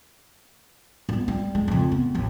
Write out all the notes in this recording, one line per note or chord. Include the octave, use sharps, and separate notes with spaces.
G3 B3
G3
G#3
F2 C#3
B3
A1 D#2